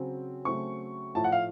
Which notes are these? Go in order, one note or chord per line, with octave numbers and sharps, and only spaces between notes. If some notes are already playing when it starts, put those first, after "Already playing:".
Already playing: C#3 F#3 C4
C#3 F#3 A3 C4 C#6
A2 F3 A3 A5
F#5
F5